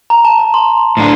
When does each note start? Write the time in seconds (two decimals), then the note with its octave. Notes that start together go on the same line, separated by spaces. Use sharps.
0.10 A#5
0.25 A5
0.39 A#5
0.54 C6
0.97 A2 A3 D4